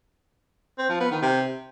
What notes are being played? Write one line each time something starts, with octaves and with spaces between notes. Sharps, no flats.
C4
F3
B3
D#3
C3